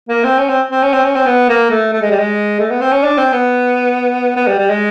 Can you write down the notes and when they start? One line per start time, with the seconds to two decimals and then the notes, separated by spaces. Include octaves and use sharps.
0.09 A#3
0.24 C4
0.39 C#4
0.49 C4
0.71 C4
0.83 C#4
0.93 C4
1.05 C#4
1.16 C4
1.26 B3
1.49 A#3
1.70 A3
1.93 A3
2.02 G#3
2.11 G3
2.19 G#3
2.60 A3
2.71 B3
2.81 C4
2.92 C#4
3.03 D4
3.18 C4
3.33 B3
4.36 B3
4.47 G3
4.58 G3
4.70 G#3